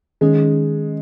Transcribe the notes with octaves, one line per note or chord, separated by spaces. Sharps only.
D#3 G#3 C#4 G#4 D#5